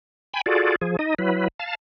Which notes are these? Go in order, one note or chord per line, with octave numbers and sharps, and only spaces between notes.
G5 G#5 B5
F4 F#4 G#4 A4 D5
F3 G#4
D#4 D#5
F#3 E4 B4
F5 A5